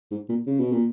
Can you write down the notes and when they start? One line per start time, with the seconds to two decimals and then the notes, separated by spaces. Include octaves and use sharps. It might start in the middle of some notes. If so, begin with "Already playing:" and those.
0.11 G#2
0.29 A#2
0.47 C#3
0.60 B2
0.72 A#2